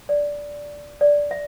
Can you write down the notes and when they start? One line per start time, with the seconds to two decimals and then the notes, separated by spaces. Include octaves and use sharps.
0.09 D5
1.01 D5
1.31 E5